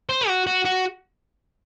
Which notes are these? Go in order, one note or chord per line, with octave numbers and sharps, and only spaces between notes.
C5
F#4
F#4
F#4